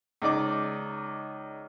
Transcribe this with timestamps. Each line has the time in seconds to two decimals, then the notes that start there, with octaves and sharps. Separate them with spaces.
0.22 C#2 D#4 D5 D6